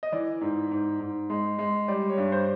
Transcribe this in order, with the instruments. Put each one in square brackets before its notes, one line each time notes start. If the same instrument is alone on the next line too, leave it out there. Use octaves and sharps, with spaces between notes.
[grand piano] D#5
[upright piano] E3 [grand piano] D5
[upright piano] G#2
G#2
G#2
G#3
G#3
[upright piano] G3 [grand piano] D5
[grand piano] C#5
[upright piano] G2
[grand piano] C5